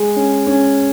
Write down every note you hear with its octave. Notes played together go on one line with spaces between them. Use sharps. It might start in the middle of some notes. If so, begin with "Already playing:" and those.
Already playing: G#3
C#4
C#4